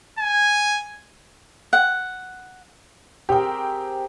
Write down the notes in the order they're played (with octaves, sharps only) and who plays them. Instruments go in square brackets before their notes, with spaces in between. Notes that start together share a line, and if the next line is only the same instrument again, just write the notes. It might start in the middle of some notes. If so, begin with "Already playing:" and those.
[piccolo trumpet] G#5
[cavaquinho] F#5
[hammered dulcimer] C4 G#4 A#4 [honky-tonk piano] G4 G5